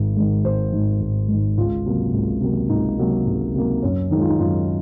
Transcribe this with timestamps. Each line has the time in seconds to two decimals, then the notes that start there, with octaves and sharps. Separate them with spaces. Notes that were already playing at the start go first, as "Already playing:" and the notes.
Already playing: G#1 G#2 D#3
0.17 G#2 D#3
0.44 G#1 C5
0.73 G#2 D#3
1.01 G#1
1.28 G#2 D#3
1.58 C#2 F4
1.86 C3 F#3 A#3
2.13 C#2
2.41 C3 F#3 A#3
2.69 C#2 D#4
2.99 C3 F#3 A#3
3.27 C#2
3.54 C3 F#3 A#3
3.83 F#2 C#4
4.11 D#3 G#3 D#4
4.20 F4
4.29 D#4
4.39 F#2 F4